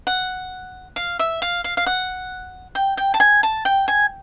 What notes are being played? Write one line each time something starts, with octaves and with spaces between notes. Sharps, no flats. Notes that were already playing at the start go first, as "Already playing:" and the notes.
F#5
F5
E5
F5
F5
F5
F#5
G5
G5
A5
G#5
A5
G5
G#5